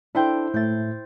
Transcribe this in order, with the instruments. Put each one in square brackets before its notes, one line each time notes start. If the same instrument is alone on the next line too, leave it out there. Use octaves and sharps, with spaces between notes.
[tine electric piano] D4 A4 [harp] E4 C5 G5
[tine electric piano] A2 A3 [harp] G6 A6